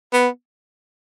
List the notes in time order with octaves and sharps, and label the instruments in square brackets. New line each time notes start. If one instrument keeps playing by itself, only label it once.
[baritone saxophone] B3